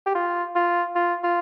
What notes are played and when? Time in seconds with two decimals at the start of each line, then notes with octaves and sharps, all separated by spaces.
0.06 G4
0.15 F4
0.55 F4
0.96 F4
1.24 F4